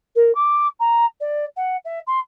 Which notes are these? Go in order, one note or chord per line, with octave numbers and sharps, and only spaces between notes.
A#4
D6
A#5
D5
F#5
E5
C6